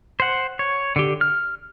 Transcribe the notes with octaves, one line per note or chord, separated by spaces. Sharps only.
C5 F#5
C#5
D3 G4
F6